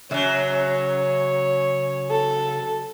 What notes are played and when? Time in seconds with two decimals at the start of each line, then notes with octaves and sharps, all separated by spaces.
0.11 F#2 C#3 F#3 C#5 E5
2.10 A4